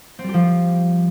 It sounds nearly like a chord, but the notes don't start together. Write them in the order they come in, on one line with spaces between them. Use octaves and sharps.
C4 G3 G4 F3